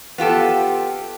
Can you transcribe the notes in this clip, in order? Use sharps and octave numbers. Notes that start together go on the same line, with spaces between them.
B3 F4 G4 A4